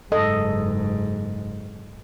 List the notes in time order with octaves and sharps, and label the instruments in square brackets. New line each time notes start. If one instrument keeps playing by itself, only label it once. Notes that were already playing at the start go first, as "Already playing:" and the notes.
[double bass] F#1 G#2 [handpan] A4 D#5